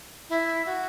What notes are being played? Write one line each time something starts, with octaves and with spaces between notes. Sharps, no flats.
E4
F#4